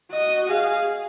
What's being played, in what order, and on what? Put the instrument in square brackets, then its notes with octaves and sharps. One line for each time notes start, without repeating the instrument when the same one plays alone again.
[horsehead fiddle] F#4 [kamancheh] D#5
[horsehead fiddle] G#4 [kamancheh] F5